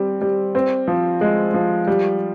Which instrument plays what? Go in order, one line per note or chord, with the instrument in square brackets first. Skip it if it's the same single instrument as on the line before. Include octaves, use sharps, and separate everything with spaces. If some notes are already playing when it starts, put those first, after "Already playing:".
Already playing: [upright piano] G3 C4
G3
C4
F3
G#3
F3
G3